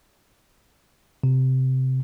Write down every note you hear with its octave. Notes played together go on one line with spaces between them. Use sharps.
C3